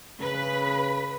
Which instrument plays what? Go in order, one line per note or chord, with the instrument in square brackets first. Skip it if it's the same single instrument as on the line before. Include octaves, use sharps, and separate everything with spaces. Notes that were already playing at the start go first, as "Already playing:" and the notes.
[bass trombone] C#3 [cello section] B4